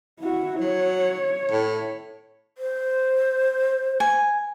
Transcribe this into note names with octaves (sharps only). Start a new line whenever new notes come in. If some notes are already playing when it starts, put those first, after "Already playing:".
E4 F#4
F#3 C#5
A2
C5
G#5